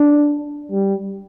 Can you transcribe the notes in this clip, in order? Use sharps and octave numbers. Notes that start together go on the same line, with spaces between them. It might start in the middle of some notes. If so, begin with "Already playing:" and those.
Already playing: D4
G3